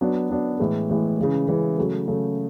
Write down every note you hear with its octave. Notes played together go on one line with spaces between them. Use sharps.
F#3 B3 D4
F#3 B3 D4
A2 E3 G#3
A2 E3 G#3
C#3 E3 G#3
C#3 E3 G#3
C#3 F#3 A3
C#3 F#3 A3